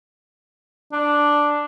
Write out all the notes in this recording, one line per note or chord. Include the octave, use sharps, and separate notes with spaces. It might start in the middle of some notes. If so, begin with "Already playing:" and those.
D4